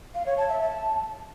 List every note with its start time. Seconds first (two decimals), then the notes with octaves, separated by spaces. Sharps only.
0.15 F5
0.26 C#5
0.38 A5
0.49 E5
0.60 A5